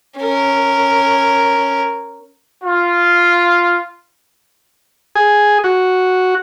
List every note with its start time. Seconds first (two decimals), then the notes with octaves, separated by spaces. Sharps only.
0.18 C#4 A#4
2.64 F4
5.15 G#4
5.64 F#4